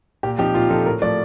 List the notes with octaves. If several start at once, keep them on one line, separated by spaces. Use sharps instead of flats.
A#2 G4
F3 C4 D#4 G4
A#2 F4
F3 C4 D#4 A4
A2 A#4
F3 A3 D5